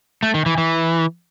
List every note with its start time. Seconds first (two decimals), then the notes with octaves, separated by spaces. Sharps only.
0.23 A3
0.34 D#3
0.46 E3
0.58 E3